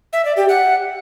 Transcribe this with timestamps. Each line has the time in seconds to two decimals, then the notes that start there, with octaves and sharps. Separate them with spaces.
0.13 E5
0.25 D5
0.37 G4
0.49 F#5